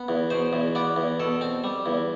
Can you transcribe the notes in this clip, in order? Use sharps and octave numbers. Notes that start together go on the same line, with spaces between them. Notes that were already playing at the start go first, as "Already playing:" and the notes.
Already playing: B3
E2
B2 C5
E2
B3 D5
E2
B2 A4
C4
G3
E2